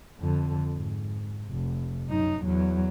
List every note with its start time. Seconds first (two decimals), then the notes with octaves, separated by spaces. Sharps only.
0.19 F2 D3
0.73 G#2
1.49 F1
2.09 F#2 D#4
2.44 E2 F#3